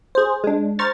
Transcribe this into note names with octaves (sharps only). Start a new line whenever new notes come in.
G#4 C5
G#3 D4
C5 A#5 C#6 F6 A6